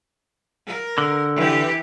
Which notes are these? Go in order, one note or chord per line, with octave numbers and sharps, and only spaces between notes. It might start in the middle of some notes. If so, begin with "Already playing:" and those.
A#4
D3
E3 G4